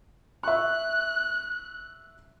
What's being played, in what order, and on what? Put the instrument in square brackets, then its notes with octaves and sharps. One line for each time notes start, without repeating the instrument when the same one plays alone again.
[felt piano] E5 C#6 [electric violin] F#6